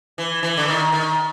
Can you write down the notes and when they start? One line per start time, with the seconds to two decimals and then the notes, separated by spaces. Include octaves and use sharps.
0.18 E3
0.43 E3
0.57 D3
0.68 D#3
0.92 D#3